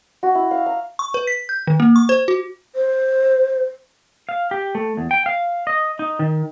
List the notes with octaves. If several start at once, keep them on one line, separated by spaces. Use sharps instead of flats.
F#4
E4
F5
A#5
C#6
B4
B6
G6
D#3
A#3
C#6
C5
F#4
C5
F5
G4
A3
E2
G5
F5
D#5
D#4
D#3